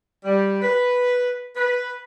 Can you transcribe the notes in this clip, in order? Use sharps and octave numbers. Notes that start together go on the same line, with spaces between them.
G3
B4
B4